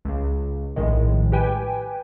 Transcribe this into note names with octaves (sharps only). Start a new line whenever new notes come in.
C#2 C#3
A#1 A2 D#3 G#3
G4 B4 G5 G#5